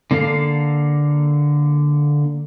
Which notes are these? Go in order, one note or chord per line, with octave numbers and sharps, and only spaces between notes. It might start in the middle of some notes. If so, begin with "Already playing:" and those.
D3 A#3 A4 F5